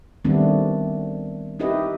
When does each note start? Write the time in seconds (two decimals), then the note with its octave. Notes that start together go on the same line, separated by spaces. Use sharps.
0.25 D#3 G3 A3 B3 C4 D4
1.59 D#4 E4 G4 B4 D#5